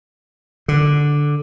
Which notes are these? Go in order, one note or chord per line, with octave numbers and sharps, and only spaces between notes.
D3